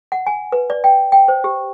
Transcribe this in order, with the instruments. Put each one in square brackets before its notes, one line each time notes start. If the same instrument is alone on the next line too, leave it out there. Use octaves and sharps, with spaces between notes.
[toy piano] F#5
G#5
B4
D5
G5
G5
C5
G4